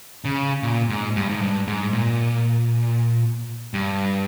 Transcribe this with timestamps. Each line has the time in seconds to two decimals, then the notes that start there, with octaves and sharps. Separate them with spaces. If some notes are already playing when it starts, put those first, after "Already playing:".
0.25 C#3
0.63 A#2
0.89 G#2
1.16 G2
1.29 G#2
1.42 G2
1.67 G#2
1.93 A#2
3.74 G2